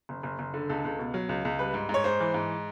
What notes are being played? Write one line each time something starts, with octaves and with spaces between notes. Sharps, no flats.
F#1
F#1
F#1
D3
C#2 A4
C#2
B2
F#3
C#2
C#2
G3 B4
G#2
G#2
C#5
G#2 C5
E3
G#2